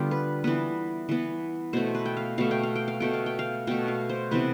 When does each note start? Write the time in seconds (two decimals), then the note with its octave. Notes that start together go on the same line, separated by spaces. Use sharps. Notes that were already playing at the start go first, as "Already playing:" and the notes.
Already playing: D3 G3 B3 F4 G4
0.11 B4
0.44 E3 B3 B4
1.09 E3 B3
1.73 B2 A3 C5
1.95 B4
2.05 G5
2.17 F5
2.38 B2 A3 F5
2.51 G5
2.63 F5
2.76 G5
2.88 F5
3.00 B2 A3 G5
3.14 F5
3.26 G5
3.39 F5
3.67 B2 A3 G5
3.88 F5
4.09 C5
4.31 C3 E3 B3 B4